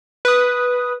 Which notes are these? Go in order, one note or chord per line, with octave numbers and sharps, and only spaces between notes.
B4 D#6